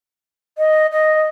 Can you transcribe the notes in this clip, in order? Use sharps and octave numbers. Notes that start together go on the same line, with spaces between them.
D#5
D#5